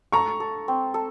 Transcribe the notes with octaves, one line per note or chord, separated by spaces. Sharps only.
A4 A#5 C#6
A4
C4
A4